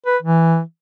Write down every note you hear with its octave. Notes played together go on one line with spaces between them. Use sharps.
B4
E3